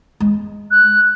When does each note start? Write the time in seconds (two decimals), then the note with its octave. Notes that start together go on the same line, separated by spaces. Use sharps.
0.20 G#3
0.71 F#6